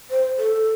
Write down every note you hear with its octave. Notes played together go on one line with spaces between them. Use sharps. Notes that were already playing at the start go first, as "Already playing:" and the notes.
C5
A4